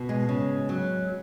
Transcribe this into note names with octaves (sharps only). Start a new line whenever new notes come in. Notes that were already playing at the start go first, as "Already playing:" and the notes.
Already playing: B2
G#3
C#3
F#3